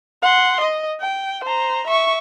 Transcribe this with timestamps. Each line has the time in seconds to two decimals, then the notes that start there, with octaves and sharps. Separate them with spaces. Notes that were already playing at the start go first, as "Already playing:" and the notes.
0.22 F#5 C6
0.60 D#5
1.01 G5
1.44 C5 A#5
1.87 E5 C#6